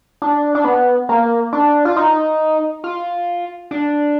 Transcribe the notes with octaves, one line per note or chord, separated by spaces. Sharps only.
D4
D4
B3
A#3
D4
F4
D#4
F4
D4